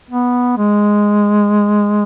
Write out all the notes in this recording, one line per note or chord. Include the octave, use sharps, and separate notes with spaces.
B3
G#3